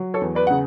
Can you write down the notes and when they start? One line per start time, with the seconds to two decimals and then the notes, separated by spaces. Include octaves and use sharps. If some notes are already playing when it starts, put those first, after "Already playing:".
Already playing: F#3
0.14 A4 C#5
0.21 E2
0.35 B4 D5
0.47 C#3 F#5